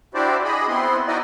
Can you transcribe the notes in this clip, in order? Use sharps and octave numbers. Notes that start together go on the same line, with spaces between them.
D4 E4 F#4 G4 C5 D5
G#4 D#5 B5
B3 C4 E4 C6
D#4 E4 F#4 D5 D#5